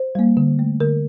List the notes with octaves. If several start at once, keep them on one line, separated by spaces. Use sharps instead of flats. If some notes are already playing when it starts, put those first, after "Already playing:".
Already playing: C5
G3 A#3
D3
A3
D3 A#4